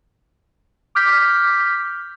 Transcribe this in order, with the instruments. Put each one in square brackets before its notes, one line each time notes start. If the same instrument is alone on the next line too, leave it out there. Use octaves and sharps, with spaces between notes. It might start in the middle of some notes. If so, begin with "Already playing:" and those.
[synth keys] D6 F6 G6 B6